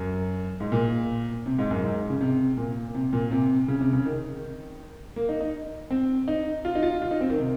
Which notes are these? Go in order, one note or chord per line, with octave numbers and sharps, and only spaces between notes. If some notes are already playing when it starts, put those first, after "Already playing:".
Already playing: F#2
G#2
A#2
C3
G#2
F#2
G#2
C#3
C3
A#2
C3
A#2
C3
C#3
C3
C#3
D#3
A#3
D#4
D#4
C4
D#4
F4
D#4
F4
F4
D#4
C4
D#3
C3